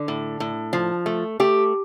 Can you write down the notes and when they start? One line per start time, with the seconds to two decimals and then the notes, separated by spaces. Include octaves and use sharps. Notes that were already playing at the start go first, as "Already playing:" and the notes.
Already playing: D3
0.08 A2
0.40 A2
0.73 F3
1.06 A3
1.40 A3 G4